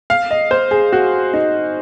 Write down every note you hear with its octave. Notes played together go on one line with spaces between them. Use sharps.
F5
D#5
C5
G#4
F#4
D#4